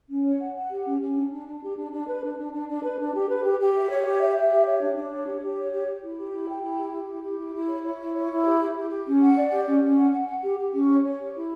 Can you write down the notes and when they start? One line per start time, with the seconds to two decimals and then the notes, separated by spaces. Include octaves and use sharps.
0.09 C#4
0.24 C#5
0.39 F#5
0.54 F#5
0.70 G4
0.85 C#4
1.00 C#4
1.15 D4
1.31 D4
1.46 D4
1.61 G4
1.76 D4
1.91 D4
2.07 B4
2.22 D4
2.37 D4
2.52 D4
2.67 D4
2.82 B4
2.97 D4
3.13 G4
3.28 B4
3.43 G4
3.59 G4
3.74 E5
3.89 C#5
4.04 G4
4.20 E5
4.35 E5
4.50 G4
4.65 C#5
4.80 D4
4.95 D4
5.11 C#5
5.26 G4
5.41 G4
5.56 C#5
5.71 G4
5.87 G4
6.02 E4
6.17 G4
6.32 E4
6.47 G5
6.63 E4
6.77 G4
6.93 G4
7.08 E4
7.24 G4
7.38 E4
7.54 E4
7.69 C#5
7.84 C#5
7.99 E4
8.15 C#5
8.29 E4
8.45 G4
8.60 G4
8.76 G4
8.90 G4
9.06 C#4
9.21 F#5
9.36 D5
9.52 G4
9.67 C#4
9.82 C#4
9.97 F#5
10.12 F#5
10.28 F#5
10.43 G4
10.58 G4
10.73 C#4
10.88 C#5
11.03 C#5
11.18 G4
11.34 E4